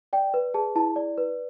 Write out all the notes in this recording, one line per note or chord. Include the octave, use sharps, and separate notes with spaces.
D5 G5
B4
G#4 A5
E4 A5
D5
B4